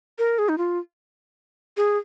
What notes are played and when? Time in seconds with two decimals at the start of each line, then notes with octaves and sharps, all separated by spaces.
0.18 A#4
0.39 G#4
0.49 D#4
0.58 F4
1.77 G#4